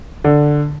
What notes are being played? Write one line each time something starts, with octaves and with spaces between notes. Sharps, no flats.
D3